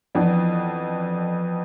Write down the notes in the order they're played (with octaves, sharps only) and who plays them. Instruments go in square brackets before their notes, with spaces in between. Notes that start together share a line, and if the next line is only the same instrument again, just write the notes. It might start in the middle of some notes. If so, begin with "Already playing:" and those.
[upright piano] F2 E3 B3 D4